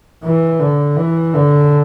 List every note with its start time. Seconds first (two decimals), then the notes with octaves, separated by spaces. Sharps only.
0.24 E3
0.60 D3
0.97 E3
1.34 D3